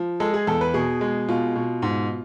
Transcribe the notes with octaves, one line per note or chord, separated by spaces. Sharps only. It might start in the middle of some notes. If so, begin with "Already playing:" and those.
Already playing: F3
G#3 A4
G#4
E2 A4
B4
B2 G#4
G#3
B2 F4
B2
G#2